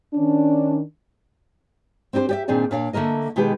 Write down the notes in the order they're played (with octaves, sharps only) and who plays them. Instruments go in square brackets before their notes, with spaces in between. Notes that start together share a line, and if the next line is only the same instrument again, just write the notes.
[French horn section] D#3 C#4 D4
[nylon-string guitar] C4 D4 G4 A#4 C5
G4 D5 E5
A#2 D#3 C4 D4 G#4 D5
A#2 D4 C#5 F5
D3 A3 A#3 A#4 D#5
B2 D#3 G#3 G4 B4